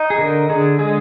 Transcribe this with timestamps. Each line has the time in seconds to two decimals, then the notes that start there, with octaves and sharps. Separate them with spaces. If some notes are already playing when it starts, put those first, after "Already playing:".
Already playing: D#4
0.10 G#4
0.18 D3 A#4
0.49 D3 G#4
0.79 G#3 G#4